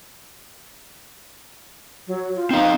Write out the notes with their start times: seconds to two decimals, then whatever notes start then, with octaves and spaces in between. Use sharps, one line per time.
2.07 F#3
2.36 F4
2.51 C4 D#4 F5